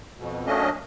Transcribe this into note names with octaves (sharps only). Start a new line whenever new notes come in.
F2 B2
F#3 A3 A#3 C#4 D4 D#5